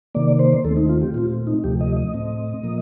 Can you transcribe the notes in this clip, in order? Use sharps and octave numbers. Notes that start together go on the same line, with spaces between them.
C3 D#3 A#3 D5
C5
D#2 D#3 A3 C4 A4
D#4
F4
G4
A#2 A3 C4 F4
D#4
D2 C3 F3 A3 G4
D#5
D#5
A2 A3 C4
A#2 F3 A#3